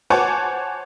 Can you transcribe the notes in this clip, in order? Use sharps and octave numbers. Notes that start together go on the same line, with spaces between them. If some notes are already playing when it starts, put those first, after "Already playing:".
C5 C#5 F#5 G#5 A5 D6